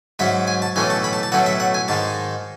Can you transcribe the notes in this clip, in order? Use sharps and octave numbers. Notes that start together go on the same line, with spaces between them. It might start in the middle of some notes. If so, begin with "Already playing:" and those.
G#2 F#3 C#4 E5
G#5
A5
B1 A2 E3 A3 C#4 G#5
A5
B5
A5
A5
B1 A2 F#3 A3 C#4 F#5
E5
F#5
G#5
G#2 D#3 G#3 A5